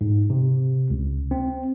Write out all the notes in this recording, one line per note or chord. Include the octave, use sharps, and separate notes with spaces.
G#2
C3
C#2
C4